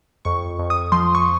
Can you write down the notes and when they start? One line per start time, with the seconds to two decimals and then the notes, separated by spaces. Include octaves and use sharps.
0.25 F2 C#6
0.59 F2
0.70 D#6
0.92 F3 C6
1.15 C#6